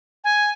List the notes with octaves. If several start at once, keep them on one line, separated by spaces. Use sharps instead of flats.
G#5